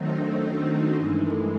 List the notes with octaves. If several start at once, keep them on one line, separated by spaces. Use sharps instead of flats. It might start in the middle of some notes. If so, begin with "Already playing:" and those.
Already playing: D#3 F#3 A3 C4 D#4
D4
C#4
D4
D4
D#4
C#4
G2 E3 G#3 D4
D#4
E4
A#4
A3 A4